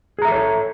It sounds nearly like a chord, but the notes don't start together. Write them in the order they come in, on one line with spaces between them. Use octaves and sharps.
G#4 A#5 E5 A4 C#5